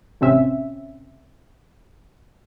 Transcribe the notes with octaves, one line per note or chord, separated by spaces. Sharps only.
A1 C3 C4 C#4 E5